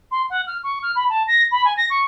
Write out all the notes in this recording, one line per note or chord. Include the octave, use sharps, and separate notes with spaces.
C6
F#5
F6
C#6
F6
B5
A5
A#6
B5
G#5
A#6
C#6